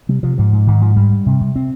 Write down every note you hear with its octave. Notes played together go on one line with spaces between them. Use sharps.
C3 G3
C3 F3
G#2 F3
G#2
G#2 D#3
G#2 F3
G2 G3
G2
C3
C3
C4